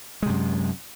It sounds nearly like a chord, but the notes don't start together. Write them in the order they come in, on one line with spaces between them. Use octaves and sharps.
G#3 C3 F#2